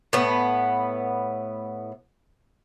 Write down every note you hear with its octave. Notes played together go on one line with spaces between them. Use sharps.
A2 B3